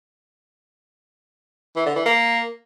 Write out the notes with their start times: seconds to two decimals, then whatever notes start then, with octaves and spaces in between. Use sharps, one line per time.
1.76 E3
1.86 D3
1.96 E3
2.06 A#3